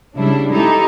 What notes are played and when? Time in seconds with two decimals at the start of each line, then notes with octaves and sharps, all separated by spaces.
0.15 C#3 G3 D4 E4
0.50 D#4 E4 G4 A4